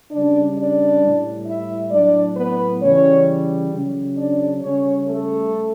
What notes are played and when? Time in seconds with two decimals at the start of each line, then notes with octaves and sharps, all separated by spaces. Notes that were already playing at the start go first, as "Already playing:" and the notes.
0.11 C#3 G3 D4 D5
0.56 D4 D5
1.02 A2 G3
1.46 E4 E5
1.91 A2 F#3 D4 D5
2.36 B3 B4
2.81 C#3 E3 G3 C#4 C#5
3.72 C#3 F#3
4.17 D4 D5
4.62 C#3 G3 C#4 C#5
5.07 A3 A4